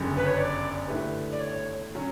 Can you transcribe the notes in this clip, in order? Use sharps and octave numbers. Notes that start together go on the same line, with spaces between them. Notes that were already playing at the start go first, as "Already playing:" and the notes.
Already playing: G1 F#2 C#3
B4
C#5
D5
D3 A3 E4 G4 B4
D5
C#5
F#3 C#4